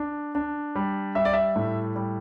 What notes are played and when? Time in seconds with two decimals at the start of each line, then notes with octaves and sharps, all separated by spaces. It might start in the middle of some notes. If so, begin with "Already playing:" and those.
Already playing: D4
0.35 D4
0.75 G3
1.15 G3 E5
1.25 D5
1.33 E5
1.56 A2
1.96 G3